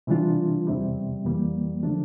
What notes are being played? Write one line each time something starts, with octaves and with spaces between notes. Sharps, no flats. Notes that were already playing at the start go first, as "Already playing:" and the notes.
C3 E3 G3 D4 F4
E2 C3 G3
F2 E3 G3 A#3
D3 F3 A3 D4